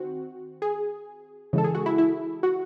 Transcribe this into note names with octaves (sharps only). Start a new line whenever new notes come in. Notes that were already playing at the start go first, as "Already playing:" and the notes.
Already playing: D#3 C4 F#4
G#4
C#3 E3 G#3 A4
G#4
F#4
E4
E4
F#4